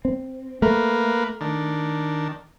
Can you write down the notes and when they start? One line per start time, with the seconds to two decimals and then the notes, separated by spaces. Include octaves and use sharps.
0.05 C4
0.62 A3 A#3 A#4 B4
1.41 D#3 D4